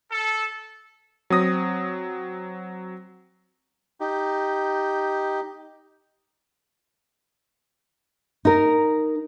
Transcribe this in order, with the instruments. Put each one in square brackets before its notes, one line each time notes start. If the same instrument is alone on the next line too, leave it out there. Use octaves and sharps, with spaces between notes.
[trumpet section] A4
[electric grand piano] F#3 C4 D#6 A#6
[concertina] D#4 G4
[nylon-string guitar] D#4 A#4